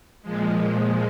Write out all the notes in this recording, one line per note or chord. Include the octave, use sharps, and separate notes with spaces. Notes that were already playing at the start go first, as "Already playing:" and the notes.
A#2 F3 G#3